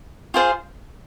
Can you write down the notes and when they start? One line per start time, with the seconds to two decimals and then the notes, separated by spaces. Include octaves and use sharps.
0.34 F4 G#4 C5 F5